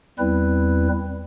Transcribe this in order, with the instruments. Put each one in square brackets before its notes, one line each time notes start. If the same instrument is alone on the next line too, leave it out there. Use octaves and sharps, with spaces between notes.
[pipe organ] E2 G3 C4 E4 B4